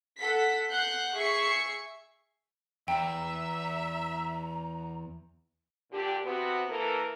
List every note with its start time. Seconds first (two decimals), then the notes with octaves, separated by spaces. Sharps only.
0.19 A4 F#5 B6
0.70 F#5 F#6 G6 C7
1.15 G#4 E5 C#6 C7 C#7
2.88 E2 E5 G5 A#5
5.92 A#2 D3 D4 G4
6.24 C3 B3 F#4
6.68 E3 A#3 A4 A#4